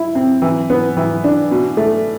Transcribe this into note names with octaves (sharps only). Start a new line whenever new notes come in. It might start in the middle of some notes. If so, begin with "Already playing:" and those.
Already playing: E4
C4
E3
B3
E3
D4
B2
A3